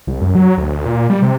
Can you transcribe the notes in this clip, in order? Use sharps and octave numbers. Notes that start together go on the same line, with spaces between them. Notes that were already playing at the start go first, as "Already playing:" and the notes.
C2
F#2
F#3
D2
A#2
G3
C3